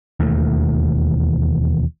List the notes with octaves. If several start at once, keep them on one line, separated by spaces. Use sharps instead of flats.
E1 D#2 E3 A3